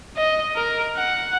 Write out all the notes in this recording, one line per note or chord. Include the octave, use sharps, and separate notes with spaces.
D#5
A#4
F#5